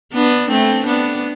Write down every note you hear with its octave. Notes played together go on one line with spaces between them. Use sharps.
B3 D4
A3 C4
B3 D4